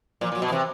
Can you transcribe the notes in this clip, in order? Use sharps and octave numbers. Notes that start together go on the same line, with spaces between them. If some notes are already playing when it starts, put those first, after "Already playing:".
A#2 F3
A#2 F#3
B2
E3
C3